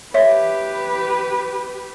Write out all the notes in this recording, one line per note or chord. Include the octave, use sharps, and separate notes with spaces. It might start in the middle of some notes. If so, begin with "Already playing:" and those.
G4 B4 C#5 E5